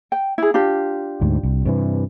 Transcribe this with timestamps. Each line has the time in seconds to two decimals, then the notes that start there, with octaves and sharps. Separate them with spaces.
0.12 G5
0.38 E4 G#4
0.54 D4 F4 G4
1.21 D2 G#2
1.43 C2
1.65 G2 C3 E3